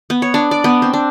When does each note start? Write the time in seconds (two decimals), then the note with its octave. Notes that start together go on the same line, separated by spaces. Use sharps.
0.10 B3
0.22 C#5
0.34 D4
0.51 D5
0.64 B3
0.82 C4
0.93 D4